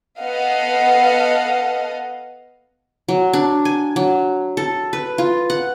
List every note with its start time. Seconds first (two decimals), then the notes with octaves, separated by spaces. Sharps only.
0.20 B3 A4 D#5 F5 F#5
3.08 F#3
3.33 D4
3.65 G#5
3.96 F#3
4.57 A4
4.93 B4
5.18 F4
5.50 F#5